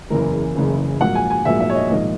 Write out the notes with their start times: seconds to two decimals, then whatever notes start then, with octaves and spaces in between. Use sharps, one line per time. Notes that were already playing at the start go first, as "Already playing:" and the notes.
0.10 F#1 E2 C#3 E3 A#4
0.55 F#1 E2 C#3 E3
1.01 A#1 G#2 F#3 A#3 F#5
1.15 G#5
1.30 G#5
1.45 A#1 G#2 F#3 A#3 E5
1.60 E5
1.69 C#5
1.75 D#5
1.90 A#1 G#2 D#3 A#3 D#5